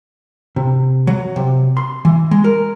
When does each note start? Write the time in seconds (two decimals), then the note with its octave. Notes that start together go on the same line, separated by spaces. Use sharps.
0.56 C3
1.07 F#3
1.36 C3
1.77 C6
2.05 E3
2.31 G#3
2.44 A#4